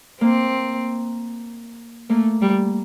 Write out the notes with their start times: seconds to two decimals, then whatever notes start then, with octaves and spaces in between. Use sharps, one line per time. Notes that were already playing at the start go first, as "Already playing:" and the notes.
0.21 A#3 C4
2.10 A3 A#3
2.41 G3